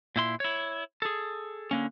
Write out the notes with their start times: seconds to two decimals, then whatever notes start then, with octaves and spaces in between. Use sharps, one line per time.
0.16 A#2 E4 C6
0.40 E4 C#5
1.02 G#4 A4
1.71 D3 A#3 C#4